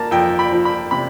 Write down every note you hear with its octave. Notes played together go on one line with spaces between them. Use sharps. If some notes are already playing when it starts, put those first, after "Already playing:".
Already playing: A#3 A5 A#5
F2 G5
B5
F3
B5
C3 B5